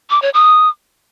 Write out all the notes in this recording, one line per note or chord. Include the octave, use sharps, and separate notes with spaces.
D6
C#5
D#6